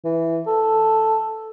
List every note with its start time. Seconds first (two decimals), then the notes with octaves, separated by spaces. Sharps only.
0.05 E3
0.47 A4